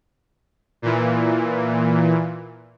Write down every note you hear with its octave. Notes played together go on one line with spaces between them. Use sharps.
A#2 E3